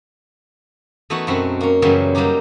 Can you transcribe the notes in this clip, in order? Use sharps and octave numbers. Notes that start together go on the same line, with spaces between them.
E3 A3 B3 D#4 F#4 B4
F#2 B2 B3 C4 F#4 B5
A#3 C#4
F#2 C#3 E3 F#3 G3 B3
F#3 G3 A#3 D#4 G4